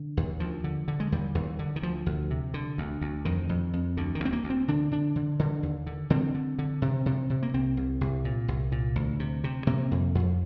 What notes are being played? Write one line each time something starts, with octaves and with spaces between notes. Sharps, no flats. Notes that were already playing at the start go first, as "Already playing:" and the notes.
Already playing: D3
D#2
D2 F3
D3
D3
G#3
D#2 G3
D#2
D3
D#3
D2 F3
D2
C3
D3
D2
D2
F2 D#3
F2
F2
D2 D3
D#3
D2
C4
A#3
D2
C4
D3 D4
D3 D4
D3
D3
D#2
D3
D3 C4
D3
D3
C3
C3
C3
A#3
C2 C4
C2
C2
A#2
C2
A#2
D2
C3
C3
C3 A#3
F2
F2